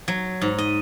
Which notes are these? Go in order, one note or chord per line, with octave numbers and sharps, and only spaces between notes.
F#3
G#2
D#5